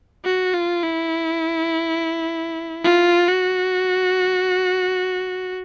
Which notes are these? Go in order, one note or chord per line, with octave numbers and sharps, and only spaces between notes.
F#4
F4
E4
F4
F#4